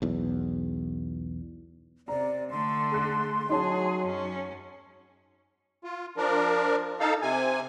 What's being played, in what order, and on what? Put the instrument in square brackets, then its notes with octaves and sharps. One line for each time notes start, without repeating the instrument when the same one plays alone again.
[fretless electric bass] B1 E2
[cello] C3 [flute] D5 [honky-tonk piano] A#5
[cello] D3 A3 [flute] C6
[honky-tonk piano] G#4 F#6
[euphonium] F#3 [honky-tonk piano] D#4 C#5 A5 [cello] G#4
[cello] F#2 C#4
[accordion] F4
F3 D4 A#4
D#4 A4 F5
C3 G#5